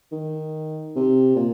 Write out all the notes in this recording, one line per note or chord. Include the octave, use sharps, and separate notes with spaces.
D#3
C3
A#2